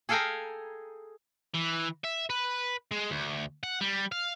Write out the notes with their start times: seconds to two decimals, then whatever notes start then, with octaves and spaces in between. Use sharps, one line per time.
0.09 G#4 A4 F5 G5 G#5 A#5
1.54 E3
2.04 E5
2.30 B4
2.92 G#3
3.11 D2
3.63 F#5
3.81 G3
4.12 F5